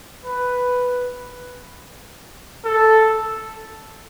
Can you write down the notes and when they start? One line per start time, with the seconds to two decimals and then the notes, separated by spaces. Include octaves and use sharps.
0.25 B4
2.65 A4